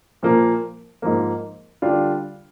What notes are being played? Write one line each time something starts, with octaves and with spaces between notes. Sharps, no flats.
A#2 F3 A#3
G#2 F3 A#3
D3 G3 D4 F4